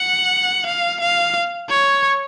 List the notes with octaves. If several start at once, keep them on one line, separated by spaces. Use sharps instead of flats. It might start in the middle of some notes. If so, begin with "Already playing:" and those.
Already playing: F#5
F5
F5
C#5